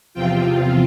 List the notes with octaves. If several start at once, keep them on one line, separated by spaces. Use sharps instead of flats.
E2 C3 F3 C4 F4 G5